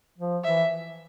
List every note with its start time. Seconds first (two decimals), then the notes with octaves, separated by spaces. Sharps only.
0.18 F3
0.44 E3 E5